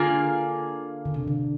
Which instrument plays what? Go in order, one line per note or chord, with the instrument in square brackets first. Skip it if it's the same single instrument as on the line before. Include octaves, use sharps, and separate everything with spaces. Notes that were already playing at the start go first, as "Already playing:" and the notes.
Already playing: [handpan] D3 [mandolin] A#3 F4 G#4
[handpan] D3
C3
D3